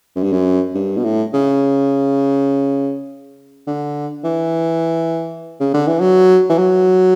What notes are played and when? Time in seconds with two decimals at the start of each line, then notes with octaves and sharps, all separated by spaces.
0.16 F#2
0.23 G2
0.32 F#2
0.75 G2
0.97 B2
1.04 A2
1.33 C#3
3.67 D3
4.24 E3
5.60 C#3
5.74 D3
5.87 E3
6.00 F#3
6.50 E3
6.58 F#3